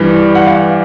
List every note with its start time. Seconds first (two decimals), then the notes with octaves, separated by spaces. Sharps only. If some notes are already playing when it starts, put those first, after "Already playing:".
Already playing: G2 E3 G3
0.35 F#5
0.46 F5